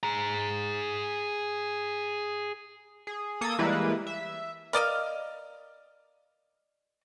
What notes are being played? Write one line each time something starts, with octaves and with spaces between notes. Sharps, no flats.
G#4 A#5
G#4
A#3 A4 D#6 G#6
E3 G3 G#3 A#3 E4 B4
E5
A#4 D5 D#5 F5